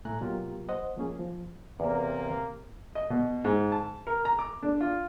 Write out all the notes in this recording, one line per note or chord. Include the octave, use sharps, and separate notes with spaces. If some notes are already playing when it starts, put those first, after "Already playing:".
A2 A3 A4 G#5 A#5 F#6
B2 F#3 A#3 F4 G4 A#4
C5 D#5 F#5
F3 A#3 C#4 G#4
F3
E2 C3 A#3
D#5
B2
G#2
A5
A#4
A#5
D6
D4
F4